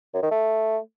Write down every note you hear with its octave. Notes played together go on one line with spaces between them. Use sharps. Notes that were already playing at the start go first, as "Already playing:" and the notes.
F#2
D#3
A3